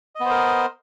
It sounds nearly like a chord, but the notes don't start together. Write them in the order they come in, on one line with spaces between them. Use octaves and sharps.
D#5 B3 C5 A#4